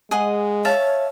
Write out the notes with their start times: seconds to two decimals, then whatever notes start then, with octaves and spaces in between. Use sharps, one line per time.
0.11 G#3 G#4 D#5 F#5
0.65 C#5 E5 F5 A5